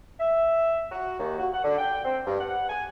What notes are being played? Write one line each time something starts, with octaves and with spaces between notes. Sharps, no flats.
E5
F#4
D#2
F#4
F#5
D3
G5
C4
G2
F#5
G#5